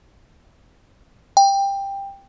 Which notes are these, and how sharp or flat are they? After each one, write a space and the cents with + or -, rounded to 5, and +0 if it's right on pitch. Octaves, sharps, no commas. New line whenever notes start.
G5 +15